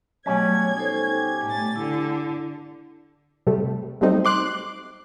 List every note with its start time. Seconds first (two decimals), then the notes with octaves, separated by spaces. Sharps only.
0.26 B2 F#3 G3 A3 C#4 C#5 F#5 G#6
0.77 D#4 A4 C5
1.10 G4
1.44 A2 A3 A6
1.76 D3 E4
3.47 C3 G3 A3
4.01 F#3 G3 A3 C4 D#4
4.25 C6 D6 F#6